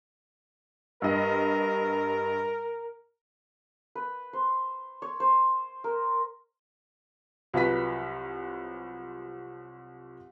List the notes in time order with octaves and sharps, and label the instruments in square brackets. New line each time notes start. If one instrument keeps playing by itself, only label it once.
[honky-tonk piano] G2 D#5 [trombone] A#4
[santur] B4
C5
C#5
C5
A#4
[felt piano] C2 F3 F#3 B4 B6